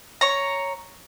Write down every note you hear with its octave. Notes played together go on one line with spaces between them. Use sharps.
C#5 A#5